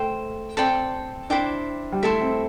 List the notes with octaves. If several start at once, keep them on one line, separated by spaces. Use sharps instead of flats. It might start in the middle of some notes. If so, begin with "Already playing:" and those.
Already playing: A3 C5 G5
C4 A4 D5 G5 C6
D4 E4 C5 G5 D6
G3
A3 E4 A4 E5 C6
C4